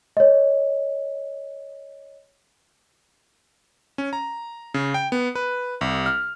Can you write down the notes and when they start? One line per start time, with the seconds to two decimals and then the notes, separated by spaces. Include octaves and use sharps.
0.17 C#5 D#5
3.98 C#4
4.13 A#5
4.74 C#3
4.94 G5
5.12 B3
5.35 B4
5.81 C2
6.06 F6